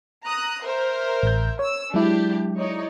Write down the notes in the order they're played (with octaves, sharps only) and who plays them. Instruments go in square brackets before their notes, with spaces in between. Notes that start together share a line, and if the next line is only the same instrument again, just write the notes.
[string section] A#5 D#6 F#6
A#4 C5 E5
[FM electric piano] A1 G6
[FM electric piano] C#5 [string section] E6
[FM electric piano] F#3 G#3 E4 [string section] D4 G4
[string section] D#4 C#5 D5